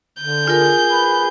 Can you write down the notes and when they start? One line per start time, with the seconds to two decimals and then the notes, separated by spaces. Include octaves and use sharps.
0.19 D3 G6
0.47 F4 G#4 A#4
0.88 B4